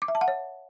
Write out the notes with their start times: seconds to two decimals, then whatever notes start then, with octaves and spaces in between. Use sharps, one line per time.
0.02 D6
0.08 E5
0.15 A5
0.21 F#5
0.28 C#5